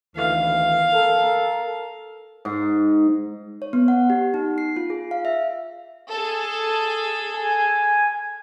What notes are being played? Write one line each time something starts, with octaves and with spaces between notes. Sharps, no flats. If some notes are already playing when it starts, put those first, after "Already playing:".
D2 D#3 E3 F5
A4 A#4
G#2
C#5
B3
F#5
G4
D#4
C7
F4
G#4
F5
E5
G#4 A4
G#5